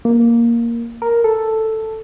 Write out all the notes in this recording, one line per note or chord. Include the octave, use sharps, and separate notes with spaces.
A#3
A#4
A4